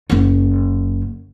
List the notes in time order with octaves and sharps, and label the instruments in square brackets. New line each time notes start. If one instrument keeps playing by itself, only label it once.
[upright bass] F#1 C#4